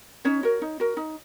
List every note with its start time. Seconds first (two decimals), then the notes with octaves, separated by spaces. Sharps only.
0.25 C#4 D#4 C#5
0.43 F#4 A#4
0.62 D#4
0.80 F#4 A#4
0.97 D#4